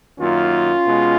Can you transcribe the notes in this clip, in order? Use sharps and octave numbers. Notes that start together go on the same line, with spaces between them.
F#2 D#3 A#3 C#4 F4
B2 G#3